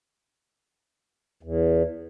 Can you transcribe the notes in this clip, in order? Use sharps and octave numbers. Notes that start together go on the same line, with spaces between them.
E2